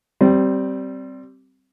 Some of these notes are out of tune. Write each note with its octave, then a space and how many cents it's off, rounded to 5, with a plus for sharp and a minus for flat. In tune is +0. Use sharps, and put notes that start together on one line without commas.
G3 -15 C4 +0